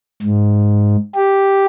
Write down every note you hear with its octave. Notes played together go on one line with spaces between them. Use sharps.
G#2
G4